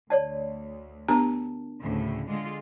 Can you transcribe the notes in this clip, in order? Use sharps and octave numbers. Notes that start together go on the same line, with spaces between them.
D2 C#5 D5 A5
B3 D4 G4 A#4 A5 A#5
D2 A2 C#3
D3 G#3 F4